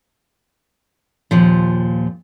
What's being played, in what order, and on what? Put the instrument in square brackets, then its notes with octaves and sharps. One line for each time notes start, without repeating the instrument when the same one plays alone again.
[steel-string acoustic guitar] D#2 A#2 F3